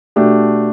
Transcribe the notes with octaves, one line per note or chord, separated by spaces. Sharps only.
B2 A3 D4 G4